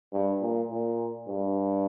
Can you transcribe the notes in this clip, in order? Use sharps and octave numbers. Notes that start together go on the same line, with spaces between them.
G2
A#2
A#2
G2